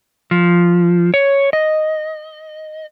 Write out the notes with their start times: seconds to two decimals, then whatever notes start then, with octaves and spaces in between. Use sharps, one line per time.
0.31 F3
1.14 C#5
1.53 D#5